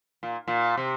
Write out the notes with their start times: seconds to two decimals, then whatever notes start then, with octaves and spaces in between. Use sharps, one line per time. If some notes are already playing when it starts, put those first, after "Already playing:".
0.23 A#2
0.48 A#2
0.77 C3